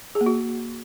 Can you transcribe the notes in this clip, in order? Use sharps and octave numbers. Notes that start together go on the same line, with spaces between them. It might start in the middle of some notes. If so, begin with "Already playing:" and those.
G#4
A#3
F#4